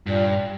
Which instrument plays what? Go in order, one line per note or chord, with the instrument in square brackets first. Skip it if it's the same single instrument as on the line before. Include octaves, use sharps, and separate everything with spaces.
[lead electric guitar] G2 [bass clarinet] A#2